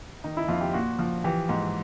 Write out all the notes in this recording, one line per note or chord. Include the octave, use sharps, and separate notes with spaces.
D#3 D#4
E4
F2 F4
G4
A#2 F#4
F3
E3 G4
G#2